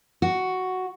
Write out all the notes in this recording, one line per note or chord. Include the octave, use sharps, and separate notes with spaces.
F#4